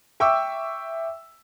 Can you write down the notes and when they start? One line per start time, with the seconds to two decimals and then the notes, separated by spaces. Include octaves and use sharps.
0.20 E5 G5 C#6 D6 E6